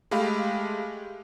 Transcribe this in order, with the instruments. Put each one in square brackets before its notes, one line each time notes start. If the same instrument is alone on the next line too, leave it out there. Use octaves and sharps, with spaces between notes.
[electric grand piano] G#3 A3 G4 F5 B5